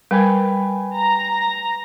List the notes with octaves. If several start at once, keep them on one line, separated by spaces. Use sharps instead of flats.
G3 A#4 B4 G5 G#5
A#5